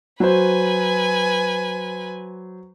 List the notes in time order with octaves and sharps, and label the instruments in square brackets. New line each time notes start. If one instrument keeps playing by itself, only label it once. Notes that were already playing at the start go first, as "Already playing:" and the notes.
[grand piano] F#3 C5 [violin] B4 G#5